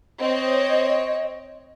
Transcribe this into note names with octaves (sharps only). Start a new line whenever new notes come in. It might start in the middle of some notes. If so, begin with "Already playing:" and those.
C4 C#5 D#5